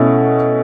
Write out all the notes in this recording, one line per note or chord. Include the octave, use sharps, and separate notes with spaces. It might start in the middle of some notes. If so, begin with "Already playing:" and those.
Already playing: B2 A3 C#4 E4